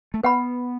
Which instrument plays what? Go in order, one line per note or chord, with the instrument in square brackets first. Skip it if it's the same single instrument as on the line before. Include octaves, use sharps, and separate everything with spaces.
[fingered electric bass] A3
[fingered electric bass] B3 [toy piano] B4 F#5 B5